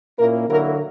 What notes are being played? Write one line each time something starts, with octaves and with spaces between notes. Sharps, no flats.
A#2 A#3 C#4 E4 A#4
D3 F#3 A#3 E4 A#4